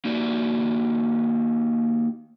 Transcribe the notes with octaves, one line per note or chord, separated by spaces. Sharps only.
A#3 D#4 F#4 D5